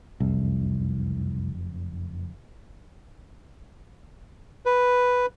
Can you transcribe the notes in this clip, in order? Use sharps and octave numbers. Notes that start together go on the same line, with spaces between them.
F#1 C2 F2
B4